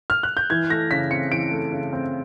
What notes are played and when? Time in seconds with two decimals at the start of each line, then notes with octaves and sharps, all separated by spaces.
0.10 F6
0.23 F#6
0.37 G6
0.50 E3 G#6
0.70 A3 A#6
0.91 C#3 B6
1.11 C4 C#7
1.32 E3 D7
1.51 A3
1.72 C#3
1.93 C4